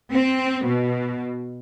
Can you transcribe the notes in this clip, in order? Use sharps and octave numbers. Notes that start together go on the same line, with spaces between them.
C4
B2